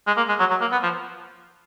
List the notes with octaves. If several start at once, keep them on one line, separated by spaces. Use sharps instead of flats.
G#3
A#3
G#3
F#3
F#3
A#3
B3
F3